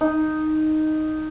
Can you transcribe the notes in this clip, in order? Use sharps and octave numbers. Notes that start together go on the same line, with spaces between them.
D#4